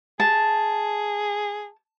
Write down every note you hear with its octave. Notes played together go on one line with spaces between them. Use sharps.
G#4 A5